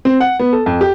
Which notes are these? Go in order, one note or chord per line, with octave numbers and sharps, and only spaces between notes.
C4
F#5
B3
A4
F2
G4